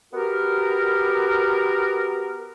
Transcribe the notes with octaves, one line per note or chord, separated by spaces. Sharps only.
B3 F#4 G4 A#4